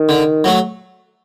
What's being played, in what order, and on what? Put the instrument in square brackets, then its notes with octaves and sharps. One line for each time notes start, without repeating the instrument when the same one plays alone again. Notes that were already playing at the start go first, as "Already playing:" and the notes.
Already playing: [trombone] D#3
[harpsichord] D3
F#3 A3